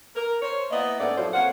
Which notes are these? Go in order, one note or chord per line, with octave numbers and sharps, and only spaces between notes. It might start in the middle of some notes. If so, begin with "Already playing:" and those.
A#4
C5 C#5
A#3 B3 E4 D5 D#5
G#2 A3 B3 C#4 D5
F#2 A2 F3 F#4 C5 C#5
F2 A#3 C#5 F5 F#5